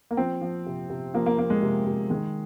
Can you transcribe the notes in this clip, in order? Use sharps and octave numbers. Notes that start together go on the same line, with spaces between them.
A#3
F3 C4
F3
C3
C3
F3 A#3
A#3
F3 A#3
G#3
C3
C3
D#3 G#3